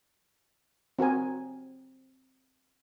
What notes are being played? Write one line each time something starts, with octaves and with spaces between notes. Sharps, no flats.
C4 F#4 A#4 G#5